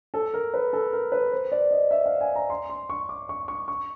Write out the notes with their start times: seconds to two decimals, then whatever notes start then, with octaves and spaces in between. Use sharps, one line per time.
0.14 A4
0.34 A#4
0.54 B4
0.73 A4
0.93 A#4
1.12 B4
1.32 C5
1.52 D5
1.71 D#5
1.91 E5
2.06 F5
2.21 G#5
2.36 A#5
2.50 C6
2.70 C6
2.90 C#6
3.09 D6
3.29 C#6
3.48 C#6
3.68 C#6